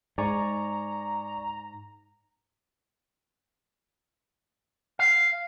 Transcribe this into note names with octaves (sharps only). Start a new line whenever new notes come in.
G#2 D5 G#5 A#5 C#6
F5